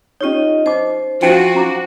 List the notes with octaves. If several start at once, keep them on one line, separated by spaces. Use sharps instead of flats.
C#4 D#4 F4 G4 C#5 D#5
D#4 C5 D#5 D6
F3 C#4 D#4 F#4 G5
C#4 A#5 D6